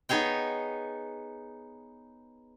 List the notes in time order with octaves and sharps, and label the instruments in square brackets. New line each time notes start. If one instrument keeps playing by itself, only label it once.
[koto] B3 D#4 G#4 C#5 G5